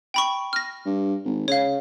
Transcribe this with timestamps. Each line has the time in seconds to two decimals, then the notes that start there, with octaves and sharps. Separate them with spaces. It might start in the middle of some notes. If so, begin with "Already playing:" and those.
0.14 G5 B5 C#6
0.53 F6 A#6
0.86 G2
1.25 G#1
1.48 C#3 C#5 F5